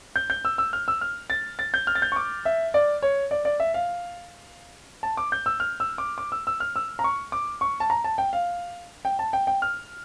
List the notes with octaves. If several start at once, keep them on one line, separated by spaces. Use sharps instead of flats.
G6
G6
E6
E6
F6
E6
F6
A6
A6
G6
F6
A6
G6
C#6
D6
E5
D5
C#5
D5
D5
E5
F5
A5
D6
G6
E6
F6
E6
D6
D6
E6
E6
F6
E6
A#5
C#6
D6
C#6
A5
A#5
A5
G5
F5
G5
A5
G5
G5
F6